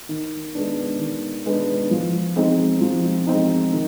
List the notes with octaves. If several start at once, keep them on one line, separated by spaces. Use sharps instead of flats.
D#3
G#3 B3 D4
D#3
G#3 B3 D4
F3
G#3 C4 D#4
F3
G#3 C4 D#4
D#3